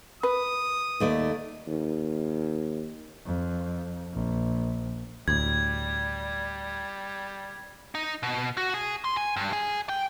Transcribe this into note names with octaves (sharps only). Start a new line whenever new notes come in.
B4 D#6
D#2 A3 D5
D#2
F2
A#1
D2 A2 G3 G#6
D#4
B2
F#4
G#4
C6
G#5
G2
G#4
G5